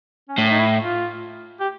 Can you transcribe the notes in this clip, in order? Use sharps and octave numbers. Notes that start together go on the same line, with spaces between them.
C#4
A2 D4
D#4
E4
F4
G4